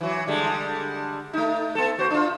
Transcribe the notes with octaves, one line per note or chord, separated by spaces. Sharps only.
E3 F#3
D3 G3 G#3
A3 D#4
B3 A4
B3 F#4 C5
D4 F4